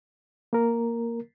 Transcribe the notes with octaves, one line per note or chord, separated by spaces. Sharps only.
A#3 A#4